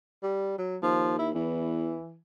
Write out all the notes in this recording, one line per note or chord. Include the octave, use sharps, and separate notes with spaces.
G3
F#3
D#2 F3
E4
E2 E3